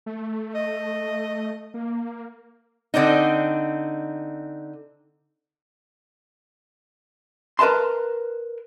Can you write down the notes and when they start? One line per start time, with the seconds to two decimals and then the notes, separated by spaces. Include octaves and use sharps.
0.06 A3
0.55 D#5
1.74 A#3
2.94 D3 C4 D4 D#4
7.59 A#4 B4 D#5 A5 C6